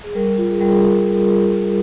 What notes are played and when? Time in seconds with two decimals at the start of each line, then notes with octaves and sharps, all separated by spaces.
0.04 G#4
0.15 G3 A#4
0.38 F4
0.50 G#4
0.59 G3 A#4
0.69 G#4
0.83 G3 A#4